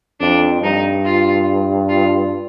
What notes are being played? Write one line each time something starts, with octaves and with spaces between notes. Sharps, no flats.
F2 D4
G2 D#4
F4
F4